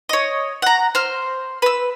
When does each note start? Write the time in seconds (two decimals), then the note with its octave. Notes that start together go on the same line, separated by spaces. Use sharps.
0.09 C#5 D#5
0.62 F#5 A#5
0.95 C5 F6
1.62 B4 E6